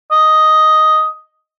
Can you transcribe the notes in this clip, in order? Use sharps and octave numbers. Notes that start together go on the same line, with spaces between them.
D#5